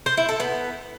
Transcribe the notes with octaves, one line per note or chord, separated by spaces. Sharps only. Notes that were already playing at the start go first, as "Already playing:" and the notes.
C5
E4
A4
B3